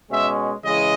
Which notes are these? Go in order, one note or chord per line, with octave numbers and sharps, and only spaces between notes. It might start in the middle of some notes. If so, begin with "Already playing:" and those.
B2 G#3 C#4 E5
C#3 E3 G#3 D#5